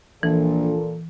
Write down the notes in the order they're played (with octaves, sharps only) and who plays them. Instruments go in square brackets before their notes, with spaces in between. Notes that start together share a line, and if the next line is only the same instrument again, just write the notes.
[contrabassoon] A#1 [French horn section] A#2 A4 [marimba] E3